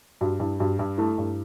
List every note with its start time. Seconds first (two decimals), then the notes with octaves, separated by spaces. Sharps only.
0.21 G2 F#4
0.40 G2 E4
0.60 G2 F#4
0.79 G2
0.98 A3 E4
1.18 G2